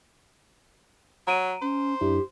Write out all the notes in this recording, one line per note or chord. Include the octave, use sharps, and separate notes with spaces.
F#3 A#5 D7 D#7
C#4 C5
F#2 D4 E4 G4